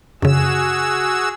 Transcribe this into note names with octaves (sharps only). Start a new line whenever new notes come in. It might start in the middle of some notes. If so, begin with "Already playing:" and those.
F#2 C#3 F#4 G#4 E6